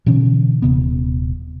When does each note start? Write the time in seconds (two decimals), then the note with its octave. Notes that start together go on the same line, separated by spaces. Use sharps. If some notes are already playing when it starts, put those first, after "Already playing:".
0.06 B2 D3 E3 C#4
0.62 D#1 C3 B3